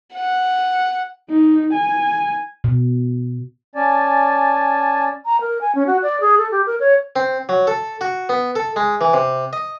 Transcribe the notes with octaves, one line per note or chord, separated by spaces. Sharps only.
F#5
D#4
G#5
B2
C#4 D5 G#5 A5
A#5
A#4
G#5
C#4
F#4
D5
G#4
A4
G4
A#4
C#5
C4
F#3
A4
F#4
B3
A4
G#3
E3
C3
D#5